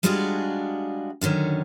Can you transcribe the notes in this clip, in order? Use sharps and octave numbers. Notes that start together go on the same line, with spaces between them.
G3 G#3 D4 F4 F#4 G#4
F#2 D3 D#3 C#4